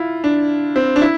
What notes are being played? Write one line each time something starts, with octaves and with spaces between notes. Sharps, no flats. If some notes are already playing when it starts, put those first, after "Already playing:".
Already playing: E4 F4
D4
C4
D4
E4